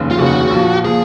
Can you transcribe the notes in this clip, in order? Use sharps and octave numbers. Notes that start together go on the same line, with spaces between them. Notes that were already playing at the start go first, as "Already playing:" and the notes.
Already playing: F1 D#2 C#3
F4
F1 D#2 C#3 F#4
A#1 A#2 F3
A#2 F3 G#4